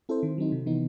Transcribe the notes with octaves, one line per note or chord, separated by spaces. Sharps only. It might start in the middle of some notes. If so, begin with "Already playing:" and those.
C4 E4 A4 C5
D#3
F#3 C4 D#4
C3
E3 B3 D#4